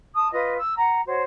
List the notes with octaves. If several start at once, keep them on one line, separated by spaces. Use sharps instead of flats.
A5 D#6
F4 B4 D#5
E6
F#5 A#5
F#4 C5 C#5